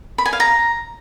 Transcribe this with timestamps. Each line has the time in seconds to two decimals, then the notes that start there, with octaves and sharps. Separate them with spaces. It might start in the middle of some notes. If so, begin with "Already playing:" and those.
0.18 B5
0.26 G#5
0.33 F5
0.40 A#5